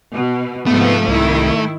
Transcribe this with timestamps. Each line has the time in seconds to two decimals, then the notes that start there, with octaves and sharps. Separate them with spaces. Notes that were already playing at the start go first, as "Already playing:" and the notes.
0.13 B2
0.66 G#2 C3 F3 A3 B3
1.08 C2 D#3 E4